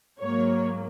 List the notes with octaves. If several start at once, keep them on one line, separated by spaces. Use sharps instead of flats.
G#2 F#3 A#3 C#5